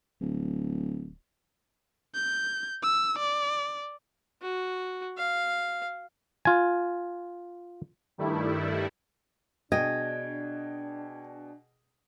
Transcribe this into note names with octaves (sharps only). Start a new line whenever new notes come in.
D1
G6
E6
D5
F#4
F5
F4 G#5
G2 D#3 G3 A3 E4
B2 D4 G#4 D#5 G5 G#6